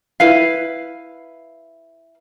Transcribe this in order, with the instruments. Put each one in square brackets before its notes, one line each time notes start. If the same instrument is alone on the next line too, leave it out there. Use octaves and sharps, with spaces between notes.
[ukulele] E4 B4 F5